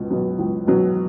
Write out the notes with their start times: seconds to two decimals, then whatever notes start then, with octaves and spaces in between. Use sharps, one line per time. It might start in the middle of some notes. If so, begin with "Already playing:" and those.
Already playing: C#2 B2
0.10 B2 F#3
0.39 C#2
0.67 B2 F#3